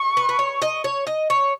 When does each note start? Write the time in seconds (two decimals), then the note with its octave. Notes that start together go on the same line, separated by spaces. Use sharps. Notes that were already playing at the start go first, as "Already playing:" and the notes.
Already playing: C#6
0.17 B4
0.29 B4
0.39 C#5
0.62 D#5
0.84 C#5
1.07 D#5
1.30 C#5